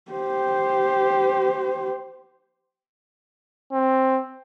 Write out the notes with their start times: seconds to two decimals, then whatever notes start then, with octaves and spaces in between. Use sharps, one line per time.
0.11 G4 C5
3.73 C4